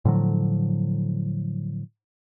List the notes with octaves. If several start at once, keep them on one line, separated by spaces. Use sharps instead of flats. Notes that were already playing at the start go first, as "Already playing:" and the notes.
A2 D3 F3 F#3